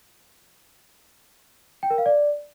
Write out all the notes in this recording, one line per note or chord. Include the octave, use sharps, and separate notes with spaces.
G5
A#4
F5
D5